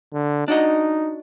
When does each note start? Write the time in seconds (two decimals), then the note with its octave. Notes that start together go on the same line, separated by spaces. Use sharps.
0.13 D3
0.48 D4 D#4 F#4 D#5